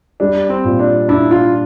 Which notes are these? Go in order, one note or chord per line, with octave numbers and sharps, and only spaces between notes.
G3 D4
C4
A#2
D4
D4 E4
F4